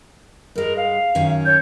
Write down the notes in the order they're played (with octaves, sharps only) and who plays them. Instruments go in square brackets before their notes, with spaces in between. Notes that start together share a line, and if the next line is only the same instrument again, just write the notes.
[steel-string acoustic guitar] G2 G#3 [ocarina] A#4
[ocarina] F5
[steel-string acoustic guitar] F#2 D#3 C#4
[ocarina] C#5 [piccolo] G6